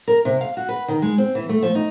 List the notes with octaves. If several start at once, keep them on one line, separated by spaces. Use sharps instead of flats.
A#4
C3
F5
F#4
B4
D#3
G#3
C4
E3
A3
F3
D#4